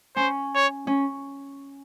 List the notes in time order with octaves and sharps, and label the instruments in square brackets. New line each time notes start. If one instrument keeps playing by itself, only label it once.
[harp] C#4 [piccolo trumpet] C5
[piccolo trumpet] C#5
[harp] C#4